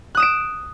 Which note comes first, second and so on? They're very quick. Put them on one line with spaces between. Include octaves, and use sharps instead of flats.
F#6 D#6 E7 D7